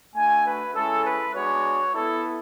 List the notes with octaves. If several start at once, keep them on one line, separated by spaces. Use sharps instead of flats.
A3 D4 F#4 G#5
B4
G#3 C#4 E4 A4
B4
G#3 B3 D4 F#4 C#5
B3 E4 A4